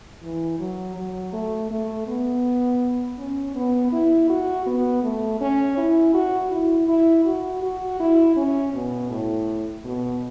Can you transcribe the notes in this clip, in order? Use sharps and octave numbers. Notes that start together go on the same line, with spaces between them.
E3
F#3
F#3
A3
A3
B3
C#4
B3
E4
F#4
B3
A3
C#4
E4
F#4
E4
E4
F#4
F#4
E4
C#4
B2
A2
B2